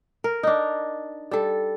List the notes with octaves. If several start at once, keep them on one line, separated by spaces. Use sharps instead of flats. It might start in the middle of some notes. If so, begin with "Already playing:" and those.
A#4
D4 D#4
G3 A4